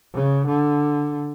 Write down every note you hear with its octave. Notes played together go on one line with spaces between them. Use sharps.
C#3
D3